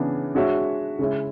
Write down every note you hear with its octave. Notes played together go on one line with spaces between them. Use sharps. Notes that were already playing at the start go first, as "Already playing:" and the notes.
Already playing: C#3 E3 B3 D4
G#3 D4 F#4 C#5 E5
C#3 G#3 C#4 E4